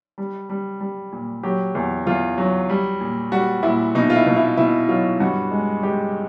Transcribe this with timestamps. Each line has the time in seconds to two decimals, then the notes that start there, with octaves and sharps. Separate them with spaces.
0.18 G3
0.50 G3
0.80 G3
1.12 A#2
1.43 F#3 G4
1.75 E2
2.07 E2 F4
2.38 F#3
2.69 G3
3.01 A#2
3.32 G3 F#4
3.63 A#2 E4
3.95 B2 D#4
4.10 F4
4.16 E4
4.27 B2
4.37 E4
4.57 B2 E4
4.89 F#3 F4
5.20 G2 F#4
5.51 G#3
5.83 G#3 G4